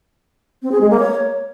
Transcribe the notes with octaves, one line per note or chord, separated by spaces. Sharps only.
C4
G#4
G#3
A#3
C#5